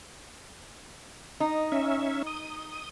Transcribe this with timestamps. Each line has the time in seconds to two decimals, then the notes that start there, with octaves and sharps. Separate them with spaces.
1.40 D#4
1.72 C#4 E5
2.27 D#6